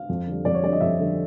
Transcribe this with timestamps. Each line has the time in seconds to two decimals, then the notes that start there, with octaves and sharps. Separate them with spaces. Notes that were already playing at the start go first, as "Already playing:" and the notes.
Already playing: F5
0.09 F2
0.27 D3 G3
0.45 F2 D5
0.55 C#5
0.63 D3 G3 D5
0.73 D#5
0.81 F2 E5
1.00 D3 G3